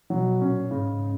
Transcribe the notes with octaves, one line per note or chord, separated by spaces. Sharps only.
B2 F#3
A#2 C#4
G#2 C#3